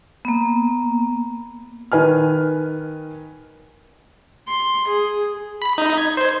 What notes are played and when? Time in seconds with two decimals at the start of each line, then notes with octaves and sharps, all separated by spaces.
0.25 A#3 B3
1.92 D#3 B4 G#5 F6
4.48 C6
4.88 G#4
5.62 B5
5.78 D#4
5.98 G#6
6.17 C5